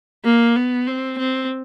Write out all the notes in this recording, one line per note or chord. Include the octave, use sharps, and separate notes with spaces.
A#3
B3
C4
C4